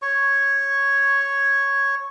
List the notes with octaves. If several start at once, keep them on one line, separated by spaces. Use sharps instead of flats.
C#5 C#6